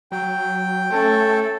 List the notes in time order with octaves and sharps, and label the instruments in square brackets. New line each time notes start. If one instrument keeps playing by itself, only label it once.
[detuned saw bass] F#3 [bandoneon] G5
[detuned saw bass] A3 [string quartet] C#4 [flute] A4